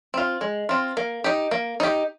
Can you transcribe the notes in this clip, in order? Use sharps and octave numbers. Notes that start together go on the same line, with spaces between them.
C4 F4
G#3
C4 F4
A#3
D#4 G4
A#3
D#4 G4